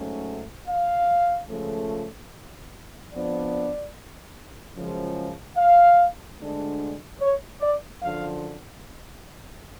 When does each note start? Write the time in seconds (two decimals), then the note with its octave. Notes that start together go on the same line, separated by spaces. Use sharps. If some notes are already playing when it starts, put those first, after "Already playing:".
Already playing: G#2 F#3 A3 C#4
0.68 F5
1.49 C#2 C#3 F3 A3
3.12 F2 F3 B3 D4 D5
4.76 F#2 C#3 F3 G#3
5.57 F5
6.38 D2 D3 G#3 D4
7.20 C#5
7.61 D5
8.01 F#2 D3 F3 F5